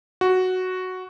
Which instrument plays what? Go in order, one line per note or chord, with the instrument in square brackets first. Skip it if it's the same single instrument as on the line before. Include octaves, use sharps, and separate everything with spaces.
[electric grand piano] F#4